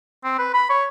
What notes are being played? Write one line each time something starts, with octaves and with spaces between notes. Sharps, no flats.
C4
B4
B5
C#5